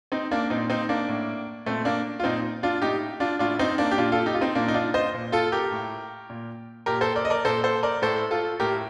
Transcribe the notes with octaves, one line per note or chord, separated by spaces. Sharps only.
C4 D#4
A#3 D4
A#2 C4 D#4
C4 D#4
A#3 D4
A2
A#2 A3 C4
A#3 D4
F4
A#2 C4 D#4
D4 F4
A2 D#4 G4
D4 F4
A2 D4 F4
C4 D#4
A#3 D4
G4
A#2 D4 F4
F4 A4
D#4 G4
F4
C4 D#4
A#2 A#3 D4
D#4
D4 F4
C5 D#5
A#2
F4 A4
G4 A#4
A2
A#2
A#2 G4 A#4
A4 C5
A#4 D5
D#5
A#4 D5
A#2 A4 C5
A4 C5
A#4 D5
A2 A4 C5
F4 A4
A2 G4 A#4